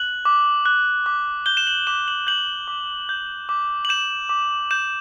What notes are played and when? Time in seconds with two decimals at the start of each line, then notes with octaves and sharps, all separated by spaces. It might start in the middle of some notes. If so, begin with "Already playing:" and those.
Already playing: F#6 F#7
0.25 D6
0.66 F#6
1.06 D6
1.46 G6 G7
1.57 E7
1.67 F#7
1.87 D6 E7
2.08 F#7
2.27 G6 F#7
2.68 D6
3.09 G6
3.49 D6
3.85 F#7
3.89 G6 E7
4.29 D6
4.71 G6 E7